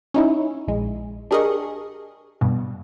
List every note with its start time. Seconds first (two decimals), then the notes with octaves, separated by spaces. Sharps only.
0.14 C#4 D#4 E4
0.68 A#1 G#3
1.31 D4 G4 G#4 A#4 D#5 C#6
2.41 G2 B2